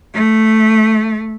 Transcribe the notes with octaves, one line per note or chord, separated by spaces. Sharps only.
A3